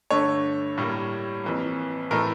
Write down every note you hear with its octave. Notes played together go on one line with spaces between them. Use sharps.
G2 D3 A3 C#5
A2 G3 A#3
F2 E3 A#3
A2 E3 A3 A#4